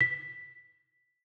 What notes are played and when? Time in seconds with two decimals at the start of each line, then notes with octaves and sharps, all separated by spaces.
0.01 B6